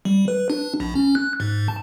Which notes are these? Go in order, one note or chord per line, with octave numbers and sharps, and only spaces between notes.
G3
B4
D4
A#1
C#4
F#6
G#2
A5